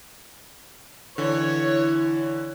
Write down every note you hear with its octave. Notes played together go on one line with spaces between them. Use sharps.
D3 E3 E4 C#5